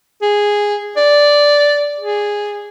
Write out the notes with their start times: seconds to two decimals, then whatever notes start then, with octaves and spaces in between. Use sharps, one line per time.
0.22 G#4
0.97 D5
2.00 G#4